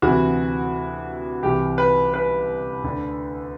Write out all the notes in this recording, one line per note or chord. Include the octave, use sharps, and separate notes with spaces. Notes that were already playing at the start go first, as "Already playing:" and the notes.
D2 C3 E3 F#4
C2 C3 E3 G4
B4
B4
D2 D3